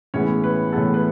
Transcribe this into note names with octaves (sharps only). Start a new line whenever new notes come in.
A2 E3 G#3 B3 C#4 C#5
B4
A2 E3 G#3 B3 A4
B4